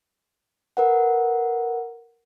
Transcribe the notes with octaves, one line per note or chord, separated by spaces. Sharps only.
A#4 B4 F#5